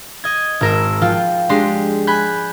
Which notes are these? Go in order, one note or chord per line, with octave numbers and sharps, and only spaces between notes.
D#5 G#6
G#1 A#4 E6
F3 F4 G5
G#3 D4 G4 C6
G#5 B5 F#6 G6